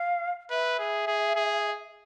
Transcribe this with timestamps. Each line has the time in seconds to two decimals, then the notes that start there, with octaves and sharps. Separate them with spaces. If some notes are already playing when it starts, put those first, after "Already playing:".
Already playing: F5
0.50 B4 E5
0.79 G#4
1.07 G#4
1.36 G#4